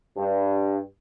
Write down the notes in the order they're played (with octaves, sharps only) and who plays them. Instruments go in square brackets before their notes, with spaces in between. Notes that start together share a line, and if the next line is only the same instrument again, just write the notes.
[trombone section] G2